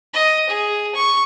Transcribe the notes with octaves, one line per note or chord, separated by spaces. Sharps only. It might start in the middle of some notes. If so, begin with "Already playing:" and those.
D#5
G#4
C#6